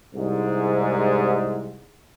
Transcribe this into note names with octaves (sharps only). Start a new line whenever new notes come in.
C2 G#2